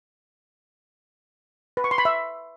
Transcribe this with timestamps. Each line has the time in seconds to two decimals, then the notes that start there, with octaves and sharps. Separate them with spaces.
1.77 B4
1.84 C#6
1.91 C6
1.98 B5
2.05 E5